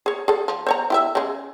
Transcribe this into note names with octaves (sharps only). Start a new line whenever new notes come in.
G#4 C#5
G#4 A4
F3
C5 C#5 A#5
E4 G4 E5
C#3 G#3